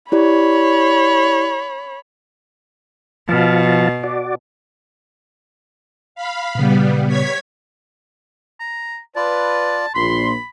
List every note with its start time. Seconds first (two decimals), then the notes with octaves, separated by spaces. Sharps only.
0.12 E4 G4 C#5 D5 B5
3.29 B2 F3 F5 A5
4.04 F#4 D5
6.15 F5 B5
6.55 A#2 C#3 G3 B3
7.07 C#5 G#6 B6
8.60 A#5
9.16 F4 B4 D5 A5
9.95 A#1 A#2 B5 C6